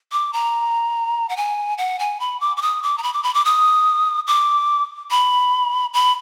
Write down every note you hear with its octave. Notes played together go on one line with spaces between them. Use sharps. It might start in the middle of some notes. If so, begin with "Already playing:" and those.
D6
A#5
F#5
G#5
F#5
G#5
B5
D6
D6
D#6
D6
A#5
B5
D6
B5
D6
D#6
D6
B5
B5